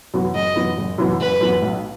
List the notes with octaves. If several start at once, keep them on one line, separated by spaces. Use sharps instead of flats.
F#2 E3 B3 F#4
F#1 D#5
F#2 E3 B3 F#4
F#1
F#2 E3 B3 F#4
F#1 B4
F#2 E3 B3 F#4
B1